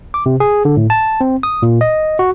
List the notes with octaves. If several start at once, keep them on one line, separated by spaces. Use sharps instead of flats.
D6
C3
G#4
D3
A2
A5
C4
D#6
A#2
D#5
F#4